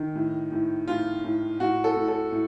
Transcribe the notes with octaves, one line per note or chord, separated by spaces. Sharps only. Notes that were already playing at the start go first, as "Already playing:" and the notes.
Already playing: D#3
A2
A2
A2 F4
A2
A2 F#4
A4
A2
A4
A2